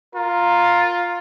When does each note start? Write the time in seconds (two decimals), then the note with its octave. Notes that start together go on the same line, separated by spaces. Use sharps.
0.15 F4 A#4